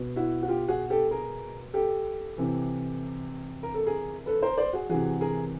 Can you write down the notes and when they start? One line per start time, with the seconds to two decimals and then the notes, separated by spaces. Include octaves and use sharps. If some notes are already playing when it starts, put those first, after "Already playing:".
Already playing: B2
0.16 E4 F#4
0.43 F#4
0.49 F4 G4
0.68 F#4 G#4
0.90 G4 A4
1.11 G#4 A#4
1.74 G4 A4
2.38 C3 E3
3.63 A#4
3.74 A4
3.86 G#4 A#4
4.26 A4 B4
4.43 A#4 C5
4.58 C5 D5
4.73 F#4 G#4
4.89 C3 E3 F#4 G#4
5.21 G#4 A#4